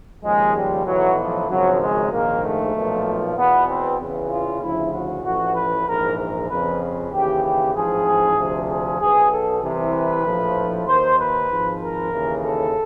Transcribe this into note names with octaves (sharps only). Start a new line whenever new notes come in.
D#2 C#3 F3 G#3
G3
B1 A2 E3 F#3
F3
G#1 F#2 C#3 F3 F#3
G#3
A#1 G#2 D#3 A#3
A3
B1 A#2 F3
E2 B2 B3
C4
E2 C#3 E3
F4
D2 C#3 F3 E4
F#4
A1 A2 F3 F#4
B4
A#1 G#2 E3 A#4
A#4
F2 C#3 F3 B4
D#2 C#3 E3 G4
G4
A1 G#2 F3 G#4
D2 C3 F3
G#4
B1 B2 G#4
A4
C2 C3 E3
B4
A#1 A2 F3
D#2 D#3 C5
B4
G#1 G#2 F3
A#4
D#2 C#3 E3
A4